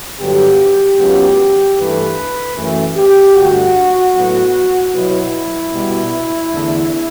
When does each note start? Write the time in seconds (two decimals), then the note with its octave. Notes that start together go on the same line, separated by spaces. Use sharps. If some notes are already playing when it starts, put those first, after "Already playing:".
0.19 G2 D3 F#3 B3 G4
0.98 C#2 C#3 F#3 B3
1.77 G2 E3 A3 B4
2.56 F#2 E3 A3
2.96 G4
3.35 G2 D3 A3 F#4
4.14 A2 F#3 B3
4.93 B2 F#3 B3 E4
5.73 B2 G3 B3
6.52 E2 D3 A3